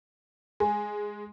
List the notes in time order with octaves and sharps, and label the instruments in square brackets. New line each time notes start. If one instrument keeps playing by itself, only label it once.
[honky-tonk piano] G#3 [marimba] G#5